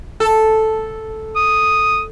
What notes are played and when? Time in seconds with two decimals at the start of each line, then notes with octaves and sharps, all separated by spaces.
0.20 A4
1.36 D#6